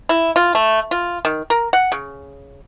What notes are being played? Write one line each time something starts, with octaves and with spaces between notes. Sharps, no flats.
E4
F4
A3
F4
D#3
A#4
F#5
C#3